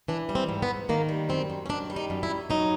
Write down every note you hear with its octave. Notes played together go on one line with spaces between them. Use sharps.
E3 D4
G3
C4
G#2
B3
G#2
D#3 A#3
G3
F#2 C4
F#2
C#4
D#3 D4
G3
D#4
F#2
E4
F#2
F#3 D#4